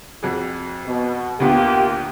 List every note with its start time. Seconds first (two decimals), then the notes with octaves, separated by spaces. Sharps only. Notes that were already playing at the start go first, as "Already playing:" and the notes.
0.23 F2 F#4 G#4
0.86 B2
1.40 D2 A#2 A#3 B3 F4 G4